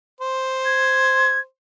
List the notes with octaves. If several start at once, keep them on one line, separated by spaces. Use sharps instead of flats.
C5
G#6